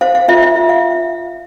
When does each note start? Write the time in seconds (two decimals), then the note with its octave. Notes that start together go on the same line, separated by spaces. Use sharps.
0.01 C5 F5
0.15 F5
0.28 F4 E5
0.43 E5
0.56 F4
0.69 F5